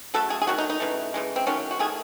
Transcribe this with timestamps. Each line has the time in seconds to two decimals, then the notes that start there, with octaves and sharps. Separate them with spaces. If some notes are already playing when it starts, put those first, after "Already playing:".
0.14 C#3 F#3 A3 A4
0.30 G#4
0.42 G#4
0.47 D#3 F#3 A3 F#4
0.58 D#4
0.70 D#4
0.80 C#3 E3 A3
1.14 C#3 E3 G#3
1.36 C4
1.47 D#3 F#3 A3 C#4
1.71 F#4
1.79 D#3 A3 G#4